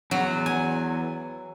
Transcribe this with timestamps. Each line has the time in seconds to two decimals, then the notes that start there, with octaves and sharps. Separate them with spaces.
0.11 E2 F#3
0.46 G#5